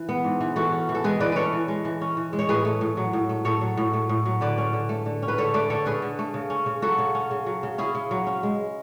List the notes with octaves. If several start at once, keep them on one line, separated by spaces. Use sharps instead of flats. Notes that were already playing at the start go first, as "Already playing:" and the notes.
Already playing: E3
B3
G#2
E3
E3 F#4 A4
C#4
E3
A4
G#3 G#4 B4
E3 B4 D5
C#4 A4 B4 C#5
E3
G#3
E3
C#4
E3
G#3
C#5
A2 G#4 B4
A3
A2
F#3
A2
A3
A2 A4 C#5
F#3
A2
A3
A2
F#3
D3 B4 D5
C#4
D3
A3
D3
C#4
B4
D3 A4 C#5
A3 B4 D5
D3 A4 C#5
C#4 G#4 B4
D3
A3
C#3
C#4
C#3
F#3 F#4 A4
C#3
C#4
C#3
F#3
C#3
C#4 E4 G#4
C#3
F#3
C#4
G#3